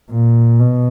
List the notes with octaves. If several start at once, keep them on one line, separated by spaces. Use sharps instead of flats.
A#2
B2